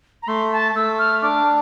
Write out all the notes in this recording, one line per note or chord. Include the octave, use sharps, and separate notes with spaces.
A#5
A3 C6
A5
A3 E6
F6
D4 D6